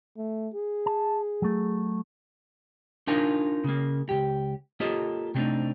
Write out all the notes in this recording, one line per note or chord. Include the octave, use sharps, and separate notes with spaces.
A3
G#4
A5
F#3 A3
D4 D#4 F4 A#4 G#5
C#3 A#3
C#2 F#2 G4
A#3 F4 G4 A4 D#5
C3 G3 A3 C4 D4 D#4